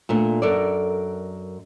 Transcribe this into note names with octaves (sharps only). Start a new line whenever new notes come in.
A#2 A3 D4
F#2 A4 A#4 D5